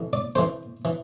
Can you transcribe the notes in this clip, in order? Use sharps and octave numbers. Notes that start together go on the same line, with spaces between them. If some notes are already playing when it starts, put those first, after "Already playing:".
Already playing: F2 E3
D5
F2 E3 C5
E3